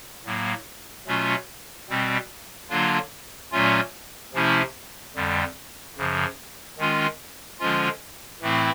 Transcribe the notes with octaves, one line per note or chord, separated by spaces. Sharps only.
A2 F#3 A#3
B2 F#3 A3 C#4 F4
B2 G3 C4
D3 F#3 A#3 D4 F4
A#2 F#3 A3 C#4 F4
C3 F3 A3 C#4 E4
F2 D3 G3
F#2 C#3 F3
D#3 G#3 C#4 F4
D3 F3 G#3 C#4 F4
A2 E3 A3 C4 E4